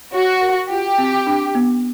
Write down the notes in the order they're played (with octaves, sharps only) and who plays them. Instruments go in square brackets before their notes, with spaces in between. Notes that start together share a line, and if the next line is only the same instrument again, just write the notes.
[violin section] F#4 [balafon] C#5
[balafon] A#4
[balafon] F4 [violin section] G4
[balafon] C4
D4
B3